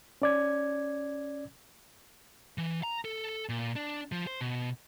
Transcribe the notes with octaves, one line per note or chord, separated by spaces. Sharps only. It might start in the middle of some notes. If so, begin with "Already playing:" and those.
C#4 D5 G#6
E3
A#5
A4
A#2
D4
F3
C5
B2